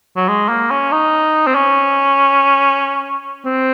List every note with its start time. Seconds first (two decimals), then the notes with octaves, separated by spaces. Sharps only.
0.16 F#3
0.28 G#3
0.49 A#3
0.70 C#4
0.92 D#4
1.47 C4
1.55 C#4
3.45 C4